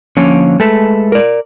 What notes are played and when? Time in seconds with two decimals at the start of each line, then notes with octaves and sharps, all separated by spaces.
0.17 D3 F3 A#3 C#4
0.60 G#3 A3 A4 B4
1.12 A#4 D5